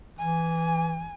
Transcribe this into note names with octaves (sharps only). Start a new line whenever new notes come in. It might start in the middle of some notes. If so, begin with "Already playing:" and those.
E3 G#5